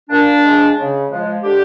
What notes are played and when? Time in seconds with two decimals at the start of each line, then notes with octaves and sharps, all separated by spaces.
0.09 A#2 D4
0.43 F3 G#3
0.77 C#3
1.10 F3 G#3
1.43 D3 G4